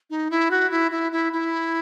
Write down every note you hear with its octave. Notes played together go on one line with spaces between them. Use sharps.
D#4
E4
F#4
E4
E4
E4
E4